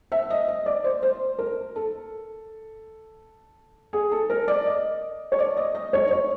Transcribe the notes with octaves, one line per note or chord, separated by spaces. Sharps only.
E5
D#5
D#5
D5
C5
C5
A#4
A4
G#4
A4
A#4
D5
D#5
C#5
D5
D#5
D#5
C#5
C#5